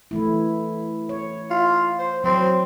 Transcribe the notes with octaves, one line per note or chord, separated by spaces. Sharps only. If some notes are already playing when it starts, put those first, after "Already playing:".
E3 A3 E4
C#5
F4
C5
F#3 C4